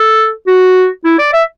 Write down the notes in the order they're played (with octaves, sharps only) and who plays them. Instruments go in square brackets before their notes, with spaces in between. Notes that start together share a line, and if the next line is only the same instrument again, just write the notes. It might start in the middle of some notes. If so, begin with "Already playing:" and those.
Already playing: [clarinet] A4
F#4
E4
D5
E5